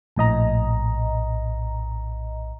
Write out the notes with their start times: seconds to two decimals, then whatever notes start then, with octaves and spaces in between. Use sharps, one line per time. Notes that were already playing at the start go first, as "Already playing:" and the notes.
0.16 A#1 A2 D#5 A#5